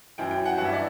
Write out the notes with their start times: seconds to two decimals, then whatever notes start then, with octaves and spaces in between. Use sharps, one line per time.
0.18 F#2 E3 G5
0.31 G5
0.45 F#5
0.58 G2 E3 F#5
0.65 E5
0.73 D5